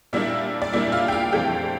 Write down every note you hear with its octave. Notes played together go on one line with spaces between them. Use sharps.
A#2 G3 A#3 D4 E4 E5
D5
A#2 G3 A#3 D4 E4 E5
F4 F5
G5
F4 F5
F2 E3 A3 D4 G4 G5